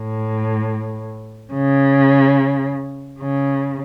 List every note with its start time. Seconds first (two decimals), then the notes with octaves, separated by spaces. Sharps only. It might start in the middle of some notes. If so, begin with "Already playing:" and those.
Already playing: A2
1.53 C#3
3.20 C#3